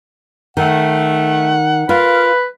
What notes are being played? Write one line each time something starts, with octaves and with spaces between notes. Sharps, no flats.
D#3 A3 F#5
F4 A#4 B4 F5